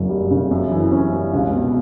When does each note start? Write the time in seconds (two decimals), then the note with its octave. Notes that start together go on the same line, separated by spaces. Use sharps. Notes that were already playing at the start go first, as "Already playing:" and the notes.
Already playing: F#1 F#2
0.09 G3
0.31 C#3
0.51 F#2
0.71 E3
0.91 C#4
1.12 G3
1.33 C#2
1.54 B2